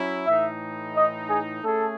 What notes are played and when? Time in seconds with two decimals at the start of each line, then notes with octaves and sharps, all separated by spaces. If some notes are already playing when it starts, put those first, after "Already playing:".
Already playing: F#3 C#4 E4
0.27 A2 E3 A3 D#4 E5
0.96 D#5
1.29 G#4
1.64 A3 C#4 G#4 A4